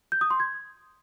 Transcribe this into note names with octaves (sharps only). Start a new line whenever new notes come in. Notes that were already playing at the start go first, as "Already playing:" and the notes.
G6
D#6
C6
G#6